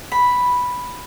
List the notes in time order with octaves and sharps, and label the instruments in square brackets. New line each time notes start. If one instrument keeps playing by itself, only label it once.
[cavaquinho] B5